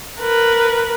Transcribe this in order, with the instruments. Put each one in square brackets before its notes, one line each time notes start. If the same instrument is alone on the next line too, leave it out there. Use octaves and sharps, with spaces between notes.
[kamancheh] A#4 B4